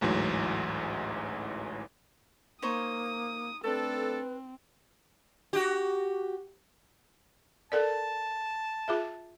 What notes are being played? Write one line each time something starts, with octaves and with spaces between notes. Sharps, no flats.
A1 D2 G#2 E3 F#3
A#3 D#4 C5 C#5 D#6
A3 C4 D4 A4 B4
F#4 G4
A4 A#4 D5 A5
F4 G#4 E5